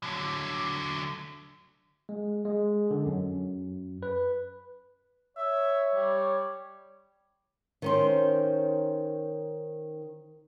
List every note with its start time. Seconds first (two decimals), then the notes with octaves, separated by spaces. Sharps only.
0.03 D3 F#3
2.09 G#3
2.45 G#3
2.91 D3
3.06 F#2
4.03 B4
5.37 C#5 E5
5.95 G3
7.82 D#3 C#4 C5